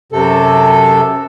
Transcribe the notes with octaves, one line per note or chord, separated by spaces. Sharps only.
F#2 C3 A4